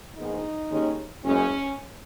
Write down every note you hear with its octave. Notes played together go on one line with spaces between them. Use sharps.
A#1 G#2 D#3 G#3 B3 D#4
D#2 D#3 G#3 C#4
F#1 F#2 C#3 G#3 C#4